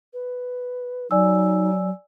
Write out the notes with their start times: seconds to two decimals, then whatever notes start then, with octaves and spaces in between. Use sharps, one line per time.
0.13 B4
1.11 F#3 D#4 D5 G#5 E6